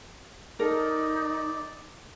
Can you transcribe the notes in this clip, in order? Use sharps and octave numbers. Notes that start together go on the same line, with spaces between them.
D#4 A4 A#4 D5